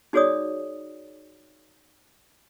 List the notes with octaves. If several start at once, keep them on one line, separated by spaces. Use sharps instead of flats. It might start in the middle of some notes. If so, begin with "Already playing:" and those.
D#4 F#4 G#4 C#5 D5 D#6